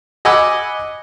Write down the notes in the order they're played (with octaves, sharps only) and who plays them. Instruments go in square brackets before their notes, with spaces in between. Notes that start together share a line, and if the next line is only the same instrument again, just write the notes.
[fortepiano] D#5 F#5 G#5 B5 D6 E6